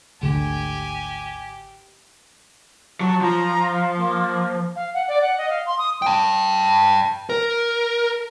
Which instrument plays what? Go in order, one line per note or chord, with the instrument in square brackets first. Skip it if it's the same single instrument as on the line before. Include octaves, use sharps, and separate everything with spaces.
[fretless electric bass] G#1 D3 [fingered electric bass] D2 [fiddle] G4 [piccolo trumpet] G#5
[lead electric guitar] F#3 [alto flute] A5
[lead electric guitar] F3 [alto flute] A#5
[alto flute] F5
A#3
[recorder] F5
F#5
D5
F#5
D#5
F5
C6
D#6
[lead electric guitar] G5 A5
A#4